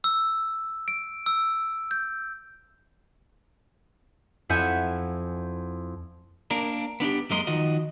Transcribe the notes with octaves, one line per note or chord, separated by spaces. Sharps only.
E6
D7
E6
G6
F2 E4 E5 F#5 G#5 G6
A#3 D4 A#4
B3 D4 D#4 G4
F#2 G#3 A#3 A#4 D#5 C6
D#3 F3 F#4 D#5